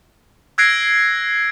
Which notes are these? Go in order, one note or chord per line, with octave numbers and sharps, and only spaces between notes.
E6 F#6 G#6 A#6 C7 D7